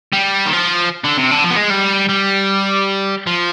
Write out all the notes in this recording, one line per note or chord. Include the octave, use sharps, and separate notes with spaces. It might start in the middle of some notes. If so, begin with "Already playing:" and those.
G3
D#3
F3
D3
C3
D3
F3
B3
G#3
G3
G3
F3